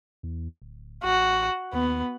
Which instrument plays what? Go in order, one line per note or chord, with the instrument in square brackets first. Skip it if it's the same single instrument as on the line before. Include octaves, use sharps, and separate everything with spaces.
[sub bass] E2
D1
[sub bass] A1 [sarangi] F#4
[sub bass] D#2 [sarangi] B3